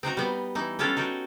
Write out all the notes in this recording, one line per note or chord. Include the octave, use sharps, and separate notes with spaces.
C4 D#4 F#4 A#5
G3 B3
E3 D#4
G3 C#4 D4 F4 A4
D#4 F#4 G4